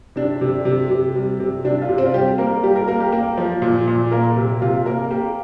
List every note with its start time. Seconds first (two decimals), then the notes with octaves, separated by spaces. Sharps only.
0.16 C3 D4
0.41 C3
0.65 C3
0.91 C3
1.16 G3
1.40 C3
1.64 C3 D4
1.82 F4
1.89 C3
1.98 C4
2.06 F4
2.14 G3 G4
2.38 A#3 A#4
2.63 G3 G4
2.76 A#4
2.88 A#3 A#4
3.00 G4
3.12 A#3
3.37 F3
3.62 A#2
3.88 A#2
4.11 A#3 A#4
4.36 C3
4.62 C3 F4
4.86 A#3 A#4
5.10 A#3 G4